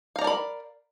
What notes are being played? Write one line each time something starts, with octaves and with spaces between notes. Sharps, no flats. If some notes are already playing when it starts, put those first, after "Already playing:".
A#4 D5 F5 A#5 B5